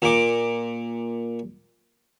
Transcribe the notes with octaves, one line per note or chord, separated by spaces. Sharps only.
A#2 D6